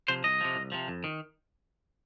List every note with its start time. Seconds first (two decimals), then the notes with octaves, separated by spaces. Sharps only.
0.08 C3 F3 C5
0.24 C2 D#5
0.41 C3 F3
0.55 C2
0.72 C3 F3
0.88 F2
1.04 D#3